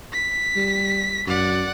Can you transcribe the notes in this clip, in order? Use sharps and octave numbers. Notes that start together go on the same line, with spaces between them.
B6
G3
F#2 D5 F#5